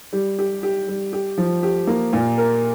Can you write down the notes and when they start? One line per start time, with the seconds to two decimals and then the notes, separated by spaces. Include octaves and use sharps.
0.13 G3
0.38 G4
0.63 G4
0.88 G3
1.13 G4
1.38 F3
1.63 G4
1.87 A#3
2.13 A#2
2.38 A#4